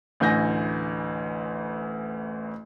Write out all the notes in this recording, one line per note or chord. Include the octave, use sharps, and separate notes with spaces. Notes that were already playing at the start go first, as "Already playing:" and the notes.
A1 D2 E3 G#5 G6 A#6